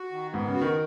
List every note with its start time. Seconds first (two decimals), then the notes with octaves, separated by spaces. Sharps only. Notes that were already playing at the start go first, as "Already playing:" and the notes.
Already playing: F#4
0.12 D#3
0.33 G#2 B3
0.48 C#3
0.54 F#4
0.61 D#3